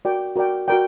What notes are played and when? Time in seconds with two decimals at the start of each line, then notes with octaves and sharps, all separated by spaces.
0.05 F#4 A#4 D5 G5
0.36 F#4 A#4 D5 G5
0.68 F#4 A#4 D5 G5